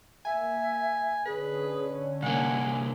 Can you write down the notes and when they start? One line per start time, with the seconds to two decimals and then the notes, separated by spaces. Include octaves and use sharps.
0.25 A#3 E5 G#5
1.26 D3 C#4 G#4 B4
2.23 C2 A#3 F#5 G#5